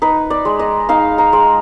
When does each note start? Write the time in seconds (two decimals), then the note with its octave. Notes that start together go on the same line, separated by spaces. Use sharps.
0.02 D#4 B4
0.30 D5
0.45 G#3
0.59 D#5
0.89 D#4 F5
1.18 A#5
1.33 G#3